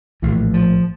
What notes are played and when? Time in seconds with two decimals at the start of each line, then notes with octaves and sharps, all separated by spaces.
0.22 A#1 A2 E3
0.54 F3